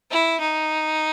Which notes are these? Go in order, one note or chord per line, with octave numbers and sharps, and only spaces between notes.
E4
D#4